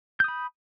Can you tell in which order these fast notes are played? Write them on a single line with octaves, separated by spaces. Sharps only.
G6 D#6 B5